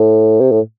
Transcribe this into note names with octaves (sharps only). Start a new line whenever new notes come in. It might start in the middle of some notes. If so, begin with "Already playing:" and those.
Already playing: A2
C3
A2